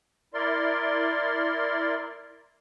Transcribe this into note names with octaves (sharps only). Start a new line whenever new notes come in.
E4 A#4 D5 C6